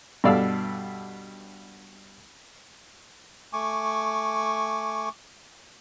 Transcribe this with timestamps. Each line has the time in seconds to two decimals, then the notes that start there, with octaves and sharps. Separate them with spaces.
0.24 G2 B2 A4 D5 F5 E6
3.53 A3 G#5 C#6 D6